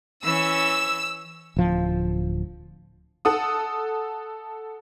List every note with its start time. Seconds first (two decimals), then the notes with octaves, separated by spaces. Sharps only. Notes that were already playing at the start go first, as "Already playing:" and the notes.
0.23 E3 C#4 E6
1.56 D1 F3
3.25 A4 F#5 D#6